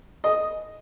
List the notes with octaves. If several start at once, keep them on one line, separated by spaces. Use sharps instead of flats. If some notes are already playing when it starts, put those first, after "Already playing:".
D#5